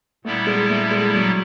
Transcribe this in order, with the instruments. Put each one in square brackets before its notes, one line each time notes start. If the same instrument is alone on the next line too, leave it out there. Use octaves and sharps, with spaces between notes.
[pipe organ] A#2 G3 B3 E4 [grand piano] A3
[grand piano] G#3
A3
G#3
F#3